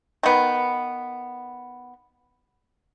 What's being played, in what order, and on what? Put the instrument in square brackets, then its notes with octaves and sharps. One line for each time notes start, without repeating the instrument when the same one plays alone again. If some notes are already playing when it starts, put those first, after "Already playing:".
[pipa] D#3 B3